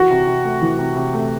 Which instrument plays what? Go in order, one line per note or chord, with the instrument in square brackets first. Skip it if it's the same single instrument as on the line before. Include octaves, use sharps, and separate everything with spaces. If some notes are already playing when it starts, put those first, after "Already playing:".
Already playing: [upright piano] E3 [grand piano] F#4
[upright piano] C3
C3
A3
E3
C3
C3
A3